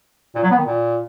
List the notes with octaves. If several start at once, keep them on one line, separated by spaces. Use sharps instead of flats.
A#2
F#3
B3
D#3
A#2